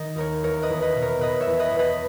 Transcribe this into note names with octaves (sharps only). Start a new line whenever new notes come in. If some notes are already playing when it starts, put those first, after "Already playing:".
Already playing: D#3 D#5
D#2 A#4 C#5
E2 A#4 C#5
B4 D#5
E2
B4 D#5
B2
A#4 C#5
B2 B4 D#5
C#5 E5
E2
B4 D#5
E2
B4 D#5